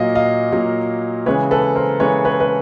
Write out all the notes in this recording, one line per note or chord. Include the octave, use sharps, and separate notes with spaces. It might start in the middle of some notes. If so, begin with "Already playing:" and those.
Already playing: A#2 F#3 A#3 D#5 F5
D#5 F5
A#2 F#3 A#3
C#3 E3 G#3 B4 C#5
A4 B4
A#4 C5
C#3 E3 G#3 B4 C#5
B4 C#5
B4